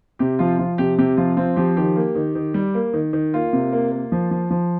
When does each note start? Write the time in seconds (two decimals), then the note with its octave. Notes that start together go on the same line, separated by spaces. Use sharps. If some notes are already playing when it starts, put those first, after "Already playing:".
0.19 C3 G4
0.39 F3 F4
0.58 F3 F4
0.78 C3 G4
0.98 C3 G4
1.17 F3 F4
1.37 C4 F4
1.56 F3 G4
1.77 D#3 G4
1.96 A#3
2.15 D#3
2.35 D#3
2.54 G3
2.74 A#3
2.93 D#3
3.13 D#3
3.34 A#3 F4
3.53 C3
3.72 A#3
3.91 A#3
4.12 F3
4.31 F3
4.50 F3